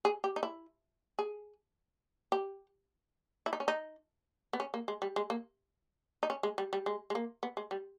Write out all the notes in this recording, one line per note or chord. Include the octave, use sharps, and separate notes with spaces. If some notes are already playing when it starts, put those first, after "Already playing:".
G#4
G4
D#4
E4
G#4
G4
E4
D#4
C#4
D#4
B3
C#4
A#3
G#3
G3
G#3
A#3
D#4
C#4
G#3
G3
G3
G#3
G#3
A#3
B3
G#3
G3